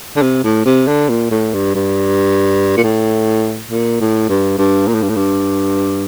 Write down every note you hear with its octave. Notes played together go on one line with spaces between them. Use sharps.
D3
C3
A2
C3
D3
A#2
A2
G2
G2
A#2
A2
A#2
A2
G2
G2
A#2
A2
G2
A2
G2